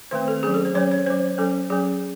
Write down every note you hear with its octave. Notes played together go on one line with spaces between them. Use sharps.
D#3 A3 C4 C5
A4
F#3 C#4 G#4
A4
C5
F#3 C#4 C#5
C#5
F#3 C#4 C5
F#3 C#4 A4
F#3 C#4 G#4